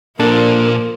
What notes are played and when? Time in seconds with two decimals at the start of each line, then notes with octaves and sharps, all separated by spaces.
0.20 A#2 F3 A#3 D4 A4 A#4